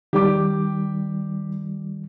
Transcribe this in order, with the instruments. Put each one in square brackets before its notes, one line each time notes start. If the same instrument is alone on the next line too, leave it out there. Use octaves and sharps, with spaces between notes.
[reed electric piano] D#3 G3 [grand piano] G4 D6